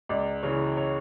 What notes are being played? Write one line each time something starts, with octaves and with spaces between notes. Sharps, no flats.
C#2 D5
C#3 E3 C#5
C#5